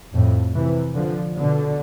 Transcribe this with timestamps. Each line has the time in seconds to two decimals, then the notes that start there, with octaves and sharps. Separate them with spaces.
0.13 F2 A2
0.54 C3 E3
0.95 D3 F3
1.36 B2 D3